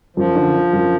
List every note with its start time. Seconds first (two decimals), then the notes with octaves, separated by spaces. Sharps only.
0.17 F#2 F3
0.35 D3
0.54 D3
0.73 F#2